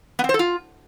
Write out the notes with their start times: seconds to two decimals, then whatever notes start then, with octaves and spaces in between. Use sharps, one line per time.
0.19 B3
0.24 C4
0.29 C5
0.34 A4
0.39 F4